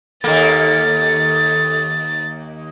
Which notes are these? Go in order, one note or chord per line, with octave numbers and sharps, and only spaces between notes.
D#2 A#3 A4 A6